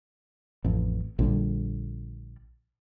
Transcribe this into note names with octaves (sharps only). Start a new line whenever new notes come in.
A1 F2
A#1 D3 G3